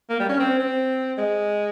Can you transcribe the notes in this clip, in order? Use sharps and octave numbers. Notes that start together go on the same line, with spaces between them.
A#3
G3
C#4
C4
C4
G#3